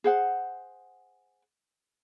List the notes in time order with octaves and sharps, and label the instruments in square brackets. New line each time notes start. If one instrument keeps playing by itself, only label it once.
[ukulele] G#4 C5 F#5